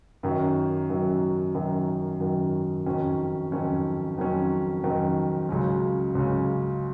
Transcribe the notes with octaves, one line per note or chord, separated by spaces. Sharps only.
F#2 D#3 F#3
F#2 D#3 F#3
F#2 D#3 F#3
F#2 D#3 F#3
F2 D#3 F#3 C#4
F2 D#3 F#3 C#4
F2 D#3 F#3 C#4
F2 D#3 F#3 C#4
C#2 C#3 F#3 C#4
C#2 C#3 F#3 C#4